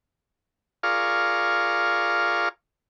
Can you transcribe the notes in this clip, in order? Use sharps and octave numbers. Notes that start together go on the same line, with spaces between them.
F4 G#4 A#4 D5 F5 C#6